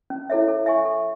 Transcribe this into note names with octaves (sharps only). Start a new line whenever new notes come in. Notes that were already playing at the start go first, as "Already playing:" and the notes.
C#4
E4 A4 C#5 E5
A4
E5 G#5 C#6
A4